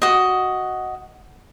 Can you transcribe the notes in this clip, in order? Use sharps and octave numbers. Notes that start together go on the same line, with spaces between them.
F#4 D#5